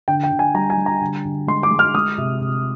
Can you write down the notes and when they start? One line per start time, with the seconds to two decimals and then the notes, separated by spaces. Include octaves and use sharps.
0.08 D3 G5
0.24 G5
0.31 D3
0.39 G#5
0.54 G3 A#5
0.70 G#5
0.77 G3
0.86 A#5
1.01 D3
1.25 D3
1.47 G#3 C6
1.63 D6
1.71 G#3
1.79 F6
1.94 G#3 D#6
2.18 C3
2.41 C3